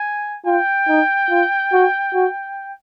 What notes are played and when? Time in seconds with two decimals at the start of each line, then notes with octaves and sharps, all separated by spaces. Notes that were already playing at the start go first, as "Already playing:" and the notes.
Already playing: G#5
0.46 F4 G5
0.88 D#4
1.30 F4
1.73 F#4
2.14 F#4